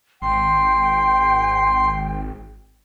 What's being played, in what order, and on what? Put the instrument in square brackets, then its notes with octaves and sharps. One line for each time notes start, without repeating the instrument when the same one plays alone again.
[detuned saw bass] G#1 [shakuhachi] G5 [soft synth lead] C6